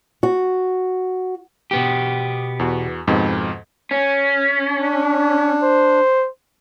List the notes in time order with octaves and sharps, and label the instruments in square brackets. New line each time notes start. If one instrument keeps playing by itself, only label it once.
[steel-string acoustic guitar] F#4
[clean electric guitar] B2 B3 G4
[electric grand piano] E2 F#4
F2 G#2 B2
[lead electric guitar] C#4
[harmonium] D4
[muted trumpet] C5